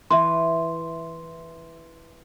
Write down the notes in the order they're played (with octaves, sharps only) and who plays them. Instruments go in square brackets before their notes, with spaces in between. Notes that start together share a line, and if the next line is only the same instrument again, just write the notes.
[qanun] E3 B4 [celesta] E5 C6